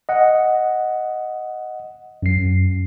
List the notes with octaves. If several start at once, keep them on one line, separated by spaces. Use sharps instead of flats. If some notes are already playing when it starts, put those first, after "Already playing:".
D#5 F#5
F#2 C7